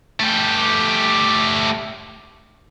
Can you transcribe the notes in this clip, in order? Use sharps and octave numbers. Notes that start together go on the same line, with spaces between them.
A3 G4